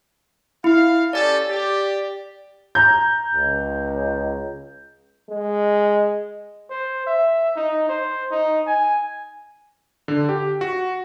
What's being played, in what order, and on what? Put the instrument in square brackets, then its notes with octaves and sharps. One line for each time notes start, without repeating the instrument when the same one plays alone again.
[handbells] E4 [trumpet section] F5
[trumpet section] C#4 G4 A4 [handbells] D5 A6
[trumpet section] G4
[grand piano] A#5 G6
[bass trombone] C#2
[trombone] G#3
[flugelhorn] C5
E5
D#4
C5
D#4
G#5
[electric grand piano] D3
G4
F#4